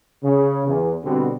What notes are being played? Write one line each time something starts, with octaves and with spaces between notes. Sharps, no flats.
C#3
E2
B2 D3 G3 C4